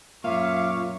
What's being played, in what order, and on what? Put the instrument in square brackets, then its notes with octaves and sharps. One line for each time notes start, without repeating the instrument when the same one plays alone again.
[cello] F#2 C#5 [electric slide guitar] A#2 [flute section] E5 D6 [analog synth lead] F5